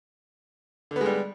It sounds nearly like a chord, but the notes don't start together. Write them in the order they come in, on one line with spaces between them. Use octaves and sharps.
D3 B3 G#3 G3